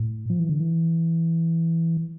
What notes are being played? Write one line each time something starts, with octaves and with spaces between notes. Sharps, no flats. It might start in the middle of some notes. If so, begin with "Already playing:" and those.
Already playing: A2
F3
E3
D3
E3